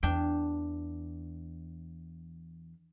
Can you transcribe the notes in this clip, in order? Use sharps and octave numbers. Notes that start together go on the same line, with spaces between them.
E2 D4 G5